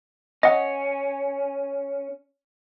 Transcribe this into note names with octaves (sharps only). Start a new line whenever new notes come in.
C#4 D#5 F#5